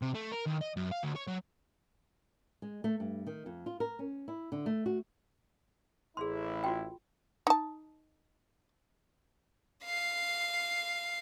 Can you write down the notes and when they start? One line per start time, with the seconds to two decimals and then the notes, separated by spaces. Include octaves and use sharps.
0.02 C3
0.15 A3
0.32 A#4
0.46 D#2
0.61 D#5
0.77 F#2
0.92 F5
1.03 D2
1.16 C#5
1.28 F#3
2.62 G#3
2.84 A3
3.00 G2
3.27 D#3
3.46 F2
3.66 F4
3.80 A#4
3.99 C#4
4.28 E4
4.52 D3
4.66 A3
4.86 F#4
6.17 A1 E4 G#4 C6
6.64 F4 F#4 G5
7.47 D#4 A5
9.85 F5 C7